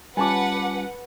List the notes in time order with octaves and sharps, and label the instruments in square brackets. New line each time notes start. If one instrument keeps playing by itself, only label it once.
[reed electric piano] G3 C#4 F4 [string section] B4 F#5 [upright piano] G#5 A5 D6